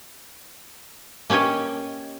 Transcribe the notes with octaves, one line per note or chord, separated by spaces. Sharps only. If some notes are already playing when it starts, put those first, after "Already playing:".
A#3 C#4 G4 C#5 D#5